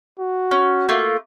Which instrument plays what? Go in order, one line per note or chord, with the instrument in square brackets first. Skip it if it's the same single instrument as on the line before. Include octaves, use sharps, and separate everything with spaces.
[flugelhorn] F#4
[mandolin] C#4
A3 A#3 F4